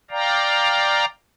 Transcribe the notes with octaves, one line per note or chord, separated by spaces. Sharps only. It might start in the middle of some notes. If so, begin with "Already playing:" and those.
D5 F5 G5 A#5